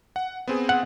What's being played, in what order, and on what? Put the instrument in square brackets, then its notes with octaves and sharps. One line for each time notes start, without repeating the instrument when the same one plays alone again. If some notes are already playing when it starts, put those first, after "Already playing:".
[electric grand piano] F#5
B3 C4 G#4
[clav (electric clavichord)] F#5